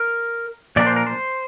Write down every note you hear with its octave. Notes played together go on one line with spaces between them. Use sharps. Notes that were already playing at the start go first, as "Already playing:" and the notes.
Already playing: A#4
A#2 F3 A#3 D4 D5
C5
A#4
C5